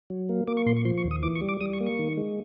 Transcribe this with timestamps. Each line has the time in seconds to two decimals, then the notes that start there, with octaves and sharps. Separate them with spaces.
0.10 F#3
0.29 A#3
0.47 A#3 D6
0.57 C#6
0.66 A#2 C6
0.76 C#6
0.85 F3 C6
0.97 C#6
1.04 D#2
1.11 D#6
1.23 E3 D6
1.35 C#6
1.41 G3
1.49 D6
1.61 G3 D#6
1.73 C#6
1.80 A#3
1.86 C#6
1.99 D#3
2.17 G#3